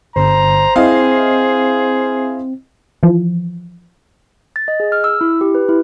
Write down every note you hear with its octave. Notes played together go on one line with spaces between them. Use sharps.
G1 C5 A#5
C4 E4 G#4 D#5 F5
E3 F3
A6
D#5
G#4
F6
E6
E4
G4
B4
E4